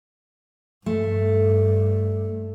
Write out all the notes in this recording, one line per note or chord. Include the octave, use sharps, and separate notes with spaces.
G2 A3